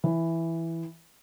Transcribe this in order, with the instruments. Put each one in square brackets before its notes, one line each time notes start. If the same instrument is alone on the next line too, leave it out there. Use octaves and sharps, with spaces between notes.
[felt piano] E3